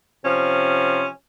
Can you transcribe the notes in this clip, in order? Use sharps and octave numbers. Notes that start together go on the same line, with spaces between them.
C3 F3 C#4